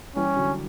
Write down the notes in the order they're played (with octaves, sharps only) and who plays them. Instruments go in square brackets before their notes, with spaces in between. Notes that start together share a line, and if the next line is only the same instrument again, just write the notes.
[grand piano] E3 G3 [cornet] C#4
[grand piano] D3 F#3